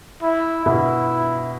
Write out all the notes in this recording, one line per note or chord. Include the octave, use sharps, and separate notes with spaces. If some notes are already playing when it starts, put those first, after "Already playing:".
E4
B2 E4